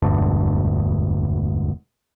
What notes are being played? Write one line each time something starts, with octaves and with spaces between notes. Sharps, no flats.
E1 D2 G2 D4